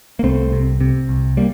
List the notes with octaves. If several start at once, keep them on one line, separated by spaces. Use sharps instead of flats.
A#3
C2 A3 C4
C3
C3
C2
G3 A#3